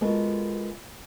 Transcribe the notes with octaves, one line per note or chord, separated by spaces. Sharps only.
G#3 B3 F4 F#4 A4 A#4